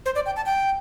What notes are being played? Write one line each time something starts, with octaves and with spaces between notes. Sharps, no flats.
C5
D5
G5
A5
G5